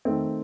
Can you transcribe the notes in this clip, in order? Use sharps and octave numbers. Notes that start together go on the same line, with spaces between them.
D#3 A3 C4